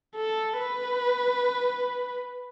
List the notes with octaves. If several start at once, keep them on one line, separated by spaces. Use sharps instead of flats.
A4
B4